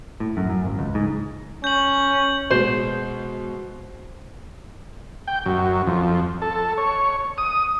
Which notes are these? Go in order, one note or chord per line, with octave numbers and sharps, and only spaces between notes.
A2
F#2
F#2
G#1
C#2
G#2
C#4 G6 F#7
B2 G#3 C5
G5
F#2
F2
A4
C#5
D#6